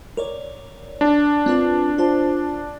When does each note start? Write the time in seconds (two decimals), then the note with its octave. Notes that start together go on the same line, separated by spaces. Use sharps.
0.17 A#4 C#5 D5
1.01 D4
1.46 C4 F4 B4
1.98 F4 C5 A5